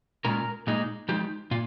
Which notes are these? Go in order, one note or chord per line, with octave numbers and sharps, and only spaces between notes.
A#2 G#3 C#4 F4 A#4
A#2 G#3 D#4
F3 G#3 D#4 G4
A#2 F4